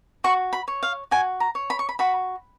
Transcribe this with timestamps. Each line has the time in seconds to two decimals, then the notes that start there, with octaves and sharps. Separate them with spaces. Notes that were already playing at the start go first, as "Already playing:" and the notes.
0.24 F#4 C#6
0.53 B5
0.68 C#5
0.83 F5
1.11 F#4 G#5
1.40 A#5
1.55 C#5
1.70 B5
1.79 C#6
1.89 B5
1.99 F#4 B5